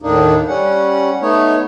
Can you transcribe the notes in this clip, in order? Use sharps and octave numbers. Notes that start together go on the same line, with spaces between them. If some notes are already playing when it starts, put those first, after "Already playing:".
D#2 A2 A#3 D4 D#4
G3 C#4 F#5
A3 B3 D#4 C#5